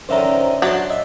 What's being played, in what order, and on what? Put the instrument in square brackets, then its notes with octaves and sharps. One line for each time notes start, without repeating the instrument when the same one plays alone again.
[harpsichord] F#2 D3 D#3 [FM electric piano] C5 E5 A#5
[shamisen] F#3 [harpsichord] D4 A5 C6
[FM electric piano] D#5 [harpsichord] E5